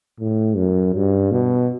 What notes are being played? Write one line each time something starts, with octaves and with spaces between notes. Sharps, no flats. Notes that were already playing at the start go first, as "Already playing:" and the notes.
A2
F#2
G2
B2